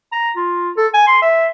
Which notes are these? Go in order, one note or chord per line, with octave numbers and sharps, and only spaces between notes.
A#5
F4
A4
G#5
C6
E5